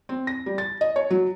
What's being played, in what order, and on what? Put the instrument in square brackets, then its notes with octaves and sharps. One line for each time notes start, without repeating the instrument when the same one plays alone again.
[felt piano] C4
A#6
G3
A6
D#5
C#5
F#3